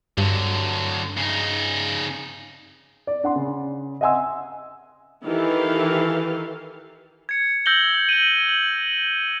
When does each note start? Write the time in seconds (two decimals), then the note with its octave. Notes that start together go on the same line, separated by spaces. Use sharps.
0.18 G2 D3 F#3
1.17 C#3 D#4
3.07 D5
3.23 D4 F#5 C6
3.36 C#3
4.01 D#5 E5 F#5 G#5 C6 E6
5.24 D#3 E3 E4 G4 A4 F5
7.29 G#6 C#7
7.66 E6 G6 A#6 F#7 G7
8.09 D#7 F#7
8.49 F#7